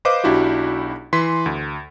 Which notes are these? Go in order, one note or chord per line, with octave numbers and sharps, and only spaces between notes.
B4 C5 D#5 F5 D6
B1 D4 E4 F#4 G4
E3 C6 B6
D2